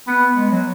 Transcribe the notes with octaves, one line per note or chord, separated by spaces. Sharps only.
B3
G#3
F#3